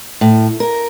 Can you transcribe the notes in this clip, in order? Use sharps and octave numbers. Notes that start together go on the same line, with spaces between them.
A2
A#4